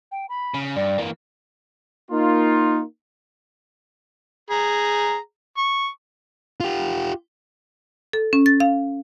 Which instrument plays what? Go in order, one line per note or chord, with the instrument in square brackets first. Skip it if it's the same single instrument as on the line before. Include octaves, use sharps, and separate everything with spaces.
[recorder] G5
B5
[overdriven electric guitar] C#3
[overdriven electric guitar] G2 [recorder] D5
[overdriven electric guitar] E3 A#3
[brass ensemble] A#3 D#4 F4
[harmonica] G#4 A#5
C#6
[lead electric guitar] F4 G4
[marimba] A4
C#4
A6
F5